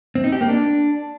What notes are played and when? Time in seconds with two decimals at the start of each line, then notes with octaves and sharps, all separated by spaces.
0.15 C4
0.24 D#4
0.32 G4
0.41 A#3
0.49 D4